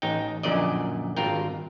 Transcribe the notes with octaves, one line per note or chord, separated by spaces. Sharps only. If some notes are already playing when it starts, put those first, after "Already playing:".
A1 D#4 G5
A#1 F#2 A#2 D3 D5 D#5
G#1 G2 F4 A#4 G5